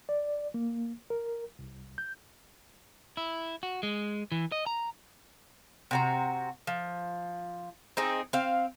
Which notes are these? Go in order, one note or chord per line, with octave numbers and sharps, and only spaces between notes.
D5
A#3
A#4
C2
G6
E4
F#4
G#3
E3
D#5
A#5
C3 F#4 A#5
F3
C4 D#4 G#4
C4 F5